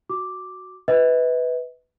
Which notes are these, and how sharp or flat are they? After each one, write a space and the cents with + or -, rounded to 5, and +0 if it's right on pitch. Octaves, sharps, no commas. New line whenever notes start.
F#4 +0 D6 +0
B4 +10 D#5 +45